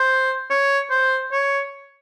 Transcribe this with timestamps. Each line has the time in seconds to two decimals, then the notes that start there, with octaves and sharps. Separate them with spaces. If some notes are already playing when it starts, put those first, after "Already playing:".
Already playing: C5
0.50 C#5
0.90 C5
1.32 C#5